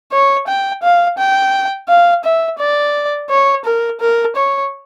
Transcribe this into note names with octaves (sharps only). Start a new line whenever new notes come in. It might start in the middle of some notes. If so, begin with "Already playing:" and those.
C#5
G5
F5
G5
F5
E5
D5
C#5
A#4
A#4
C#5